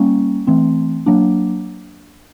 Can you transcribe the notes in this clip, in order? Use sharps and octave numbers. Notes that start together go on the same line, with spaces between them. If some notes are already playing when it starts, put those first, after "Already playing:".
Already playing: G3 A#3 C#4
E3 A3 C4
F#3 A#3 D4